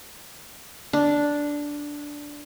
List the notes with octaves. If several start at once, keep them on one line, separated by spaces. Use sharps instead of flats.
D4